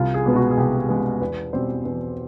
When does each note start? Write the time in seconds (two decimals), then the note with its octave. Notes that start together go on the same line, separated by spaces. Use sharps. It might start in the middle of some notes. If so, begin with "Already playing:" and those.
Already playing: C2 F4
0.14 G#4
0.26 B2 G#3 B3
0.36 F#4
0.51 G#4
0.57 C2 G4
0.79 G#4
0.89 B2 G#3 B3
1.20 E2 B4
1.53 B2 G3 C4 C5
1.85 E2 B4